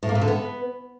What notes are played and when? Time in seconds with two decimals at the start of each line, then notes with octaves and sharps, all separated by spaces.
0.03 A2
0.09 A#3
0.15 A#2
0.21 D3
0.28 B3